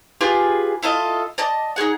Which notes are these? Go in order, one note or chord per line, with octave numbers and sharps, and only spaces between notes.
F4 G4 G#4 B4
E4 F4 A4 D#5
D5 D#5 A5
D#4 F4 G#4 F#5